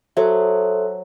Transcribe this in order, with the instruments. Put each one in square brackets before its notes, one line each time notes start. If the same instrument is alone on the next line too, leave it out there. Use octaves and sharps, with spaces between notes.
[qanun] F#3 [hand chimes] A4 C5 E5